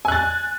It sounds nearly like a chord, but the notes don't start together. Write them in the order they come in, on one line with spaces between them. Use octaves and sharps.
G#5 F#6 A6